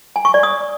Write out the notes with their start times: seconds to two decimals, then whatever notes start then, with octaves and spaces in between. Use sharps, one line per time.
0.16 G#5
0.25 C#6
0.34 D5
0.43 D#6